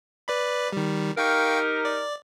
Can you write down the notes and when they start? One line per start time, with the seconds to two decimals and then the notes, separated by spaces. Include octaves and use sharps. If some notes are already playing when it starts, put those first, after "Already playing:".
0.28 B4 D5 B5
0.73 D#3 G3
1.17 D#4 G4 A#4 F5 G5 C#6
1.85 D5